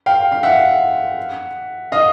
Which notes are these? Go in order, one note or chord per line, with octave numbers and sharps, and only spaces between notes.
F5 G5
F5
E5 F#5
D#5 F5